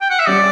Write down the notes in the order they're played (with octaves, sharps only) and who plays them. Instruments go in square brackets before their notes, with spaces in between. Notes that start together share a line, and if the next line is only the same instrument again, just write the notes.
[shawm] G5
F#5
E5
[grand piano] G3 C#4 G4 [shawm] D5